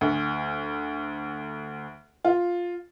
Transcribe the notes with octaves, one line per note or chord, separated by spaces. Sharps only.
D2
F4